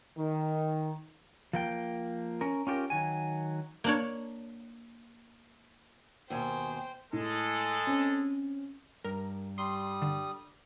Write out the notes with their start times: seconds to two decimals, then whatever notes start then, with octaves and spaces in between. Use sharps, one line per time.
0.17 D#3
1.53 F3 A#3 G5
2.41 C#4 A#4
2.67 C#4 F4 G4 A4 A#4
2.90 D#3 F#3 G#5
3.84 A#3 D4 C#5
6.30 D#2 B2 C5 G5 G#5
7.13 A2 G#3 A4
7.87 C4 C#4
9.04 G2 A#4
9.58 G3 C6 D#6
10.02 D3